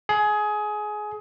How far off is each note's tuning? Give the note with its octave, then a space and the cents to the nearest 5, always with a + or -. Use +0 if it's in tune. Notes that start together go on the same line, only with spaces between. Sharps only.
G#4 +20